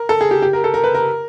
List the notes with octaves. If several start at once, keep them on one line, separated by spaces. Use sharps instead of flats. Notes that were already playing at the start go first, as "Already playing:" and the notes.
Already playing: A#4
A4
G#4
G4
G4
A#4
A4
A#4
B4
A#4